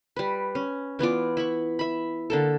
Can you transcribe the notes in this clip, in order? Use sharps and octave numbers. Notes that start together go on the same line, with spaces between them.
G3 B4
C#4
E3 B3 F4 D5
E4 B5 C#6
E5 B5
D3 A#3 A4